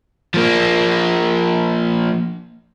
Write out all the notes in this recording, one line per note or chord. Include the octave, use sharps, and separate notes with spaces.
F3 A#3